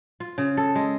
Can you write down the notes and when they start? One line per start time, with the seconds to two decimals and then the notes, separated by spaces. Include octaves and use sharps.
0.20 F4
0.38 C#3
0.57 A4
0.75 G#3